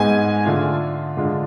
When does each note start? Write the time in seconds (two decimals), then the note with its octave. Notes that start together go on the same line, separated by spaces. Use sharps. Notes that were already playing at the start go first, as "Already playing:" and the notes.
Already playing: G#2 G#3 B3 G#5
0.46 D3 A3 D4 F4
1.17 D3 G#3 D4 F4